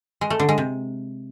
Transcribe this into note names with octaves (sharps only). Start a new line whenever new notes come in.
G#3
A3
D3
G#3
C3